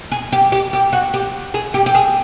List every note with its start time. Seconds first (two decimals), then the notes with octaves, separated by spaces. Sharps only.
0.12 G#4
0.33 G4
0.52 G4
0.73 G4
0.93 F#4
1.14 G4
1.54 G#4
1.74 G4
1.86 G4
1.95 G#4